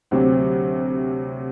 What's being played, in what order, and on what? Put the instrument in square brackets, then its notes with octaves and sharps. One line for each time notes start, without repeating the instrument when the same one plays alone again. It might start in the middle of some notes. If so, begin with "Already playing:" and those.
[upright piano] D2 C3 F#3 C4